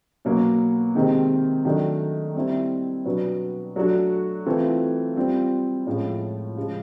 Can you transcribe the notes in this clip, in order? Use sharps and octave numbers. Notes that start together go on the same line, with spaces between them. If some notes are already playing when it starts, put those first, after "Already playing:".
B2 F#3 A#3 C#4
C3 D#3 G#3 C4
D#3 F#3 A3 D4
G3 C4 E4
B2 F#3 B3 D4 F#4
F#3 A3 D4 F#4
E3 A3 C4 F4
G3 C4 F4
A2 F3 G#3 C#4
C#3 F3 G#3